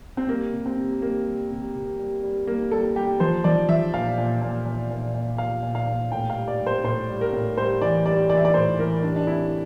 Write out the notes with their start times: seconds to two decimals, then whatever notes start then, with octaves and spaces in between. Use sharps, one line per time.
0.17 C4
0.29 G3 A#3
0.53 C3
0.66 C4
0.77 C3
1.01 G3 A#3
1.26 G3
1.51 C3
1.75 C3
1.99 G3
2.23 G3
2.47 G3 A#3
2.71 G3 A4
2.96 G3 G4
3.20 F3 C5
3.44 F3 D5
3.69 F3 E5
3.94 A#2 F5
4.18 A#2
4.42 A#2
4.66 A#2
4.90 A#2
5.15 A#2
5.38 A#2 F5
5.63 A#2
5.75 F5
5.87 A#2
6.11 A2 G5
6.30 F5
6.36 G3
6.48 D5
6.60 G3
6.66 C5
6.84 A2 C5
7.09 G3
7.21 A#4
7.33 A2
7.57 G3 C5
7.82 E3 D5
8.06 G3 D5
8.30 E3 D5
8.37 E5
8.45 D5
8.54 A2 C5
8.79 E3 A#4
9.03 G3 D4
9.16 D4
9.27 C3 E4